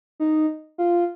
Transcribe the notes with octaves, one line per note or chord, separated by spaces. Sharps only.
D#4
F4